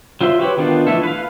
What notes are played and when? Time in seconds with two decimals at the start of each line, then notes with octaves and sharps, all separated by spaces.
0.21 F#3 F4 C5 E5 C6
0.39 F#4 G4 B4 C#5
0.57 D#3 B3 D4 D#4 F4
0.87 E3 F3 A3 E4 A4
1.03 B4 F5